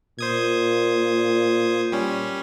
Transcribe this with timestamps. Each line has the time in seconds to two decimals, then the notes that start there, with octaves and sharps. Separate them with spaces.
0.19 A#2 C5 D#6 G#6
1.92 G3 C#4